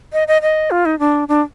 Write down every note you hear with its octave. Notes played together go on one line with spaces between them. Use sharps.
D#5
D#5
D#5
F4
D#4
D4
D4